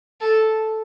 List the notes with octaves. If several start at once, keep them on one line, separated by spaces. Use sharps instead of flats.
A4